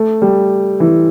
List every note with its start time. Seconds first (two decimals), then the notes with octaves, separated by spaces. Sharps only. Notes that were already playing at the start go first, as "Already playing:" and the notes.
Already playing: A3
0.22 G3
0.80 E3